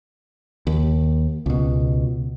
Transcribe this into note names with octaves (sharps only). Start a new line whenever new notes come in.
D#2
C#2 B2